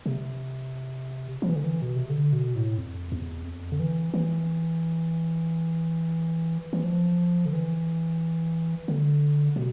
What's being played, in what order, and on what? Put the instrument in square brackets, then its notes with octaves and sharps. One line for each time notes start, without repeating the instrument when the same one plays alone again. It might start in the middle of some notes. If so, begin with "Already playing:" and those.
[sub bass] C3
F3
E3
D3
E3
B2
C3
D3
B2
A2
F2
E2
F2
D3
E3
E3
E3
F3
D3
E3
D3
B2